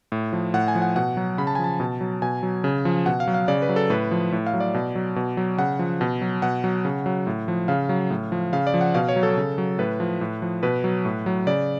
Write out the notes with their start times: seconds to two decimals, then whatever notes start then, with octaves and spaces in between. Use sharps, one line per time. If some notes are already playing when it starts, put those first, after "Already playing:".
0.12 A2
0.33 F3
0.54 A2 F#5
0.68 G#5
0.75 F3
0.82 F#5
0.96 B2 F#5
1.17 F#3
1.38 C#3 B5
1.47 A5
1.55 G#5
1.59 F3
1.64 A5
1.80 B2
2.01 F#3
2.22 B2 G#5
2.43 F#3
2.64 C#3
2.85 F3
3.06 B2 F#5
3.20 F5
3.27 F#3
3.34 F5
3.48 C#3 D5
3.62 B4
3.69 F#3
3.76 A4
3.90 A2 B4
4.11 F3
4.32 A2
4.47 F5
4.54 F#3
4.60 D5
4.74 B2
4.95 F#3
5.16 B2
5.37 F#3
5.58 C#3 F#5
5.79 F3
6.01 B2
6.21 F#3
6.42 B2 F#5
6.64 F#3
6.85 C#3
7.06 F#3
7.27 A2
7.48 F3
7.68 C#3 F5
7.89 F#3
8.10 A2
8.32 F3
8.53 C#3 F5
8.67 D5
8.74 F3
8.81 F#5
8.94 B2 F5
9.09 C#5
9.16 F#3
9.23 A4
9.37 C#3
9.58 F#3
9.79 A2 B4
10.00 F3
10.21 A2
10.42 F3
10.63 B2 B4
10.84 F#3
11.05 A2
11.26 F#3
11.47 C#3 D5